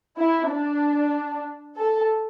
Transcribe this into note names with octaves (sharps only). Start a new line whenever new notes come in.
E4
D4
A4